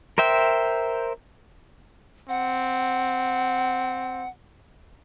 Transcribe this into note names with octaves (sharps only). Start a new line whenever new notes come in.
A#4 C5 E5 G5
C4 F#5